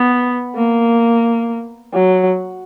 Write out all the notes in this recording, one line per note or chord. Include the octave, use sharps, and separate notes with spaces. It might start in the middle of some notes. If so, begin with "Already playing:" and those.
Already playing: B3
A#3
F#3